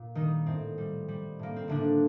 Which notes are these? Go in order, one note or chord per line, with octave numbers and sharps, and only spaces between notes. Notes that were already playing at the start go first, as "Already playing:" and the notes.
Already playing: A#2
D#3 G3 D#4
A2 C4
G3
G3
A2 A#3
C4
A2 D3 D4